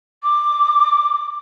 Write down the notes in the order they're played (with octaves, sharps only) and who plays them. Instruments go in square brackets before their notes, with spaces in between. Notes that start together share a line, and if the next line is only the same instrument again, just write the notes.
[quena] D6